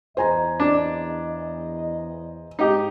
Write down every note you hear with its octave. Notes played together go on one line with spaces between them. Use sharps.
E2 C5 D#5 G#5 A#5
D4
G#2 D#4 G4